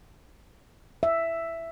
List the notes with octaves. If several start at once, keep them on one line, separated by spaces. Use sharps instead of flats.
E5